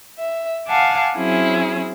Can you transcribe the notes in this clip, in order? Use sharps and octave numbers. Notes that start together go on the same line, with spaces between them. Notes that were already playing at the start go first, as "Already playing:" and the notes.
E5
F5 F#5 G#5 A5 D6
F#3 C4 C#4 E4 G#4